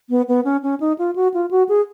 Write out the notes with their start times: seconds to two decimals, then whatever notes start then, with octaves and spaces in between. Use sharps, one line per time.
0.10 B3
0.28 B3
0.45 C#4
0.63 C#4
0.80 D#4
0.99 F4
1.16 F#4
1.34 F4
1.51 F#4
1.69 G#4